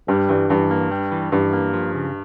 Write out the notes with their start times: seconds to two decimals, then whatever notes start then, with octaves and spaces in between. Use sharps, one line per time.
0.08 G2 G3
0.29 G2 E3
0.50 G2 E3
0.71 A#3
0.91 G3
1.12 E3
1.32 G2 E3
1.53 A#3
1.74 F3
1.95 C#3